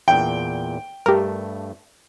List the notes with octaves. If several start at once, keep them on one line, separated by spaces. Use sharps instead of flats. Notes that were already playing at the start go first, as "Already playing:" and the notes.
E2 A#2 G5
G2 A3 G4 A#4